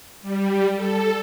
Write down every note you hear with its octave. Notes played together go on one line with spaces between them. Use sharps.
G3
A4